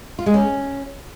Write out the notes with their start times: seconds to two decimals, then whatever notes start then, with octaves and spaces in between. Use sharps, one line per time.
0.19 F4
0.26 G#3
0.34 C#4